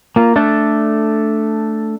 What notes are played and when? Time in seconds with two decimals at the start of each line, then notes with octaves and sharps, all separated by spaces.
0.16 A#3 F4
0.36 A3 D4 A4